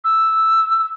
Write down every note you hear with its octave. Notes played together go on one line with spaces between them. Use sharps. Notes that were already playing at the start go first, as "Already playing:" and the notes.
E6